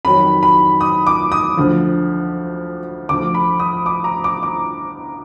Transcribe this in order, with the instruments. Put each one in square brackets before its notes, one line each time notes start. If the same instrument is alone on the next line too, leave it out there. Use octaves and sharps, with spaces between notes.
[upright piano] F2 D#3 F#3 B5
B5
D#6
D6
D#6
D2 D3 F3
D2 D3 F3 D6
B5
D#6
D6
A#5
D6
D6